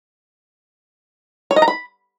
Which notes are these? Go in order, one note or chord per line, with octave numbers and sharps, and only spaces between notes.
C#5
D#5
A#5
B5